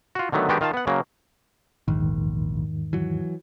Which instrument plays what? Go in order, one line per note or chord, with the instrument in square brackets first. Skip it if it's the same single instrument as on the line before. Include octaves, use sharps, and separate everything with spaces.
[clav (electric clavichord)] F4 F#4
D3 D#3 F#3 A3 B3
D#3 G#3 B3 D4 F#4 G4
D#3 F4 F5 A5
B3 F#5
C#3 F#3 A#3
[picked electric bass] A#1 [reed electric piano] E2 G#2 D#3
[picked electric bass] E3 F#3